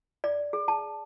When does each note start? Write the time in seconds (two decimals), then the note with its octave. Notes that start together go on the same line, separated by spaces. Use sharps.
0.24 D5
0.53 G#4
0.68 A5